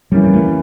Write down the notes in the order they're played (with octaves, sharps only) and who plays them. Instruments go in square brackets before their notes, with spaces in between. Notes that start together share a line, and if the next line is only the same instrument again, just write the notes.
[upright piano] E3 A#3 C#4 [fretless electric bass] G3
[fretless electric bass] G3
A3